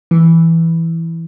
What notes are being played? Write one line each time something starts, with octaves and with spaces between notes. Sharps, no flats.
E3